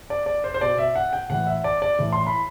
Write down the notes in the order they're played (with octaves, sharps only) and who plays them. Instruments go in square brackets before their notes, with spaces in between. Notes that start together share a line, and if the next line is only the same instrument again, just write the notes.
[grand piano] D5
D5
C5
C5
B2 D5
E5
F#5
G5
A2 E3 F#5
E5
D5
D5
A2 E3
C6
B5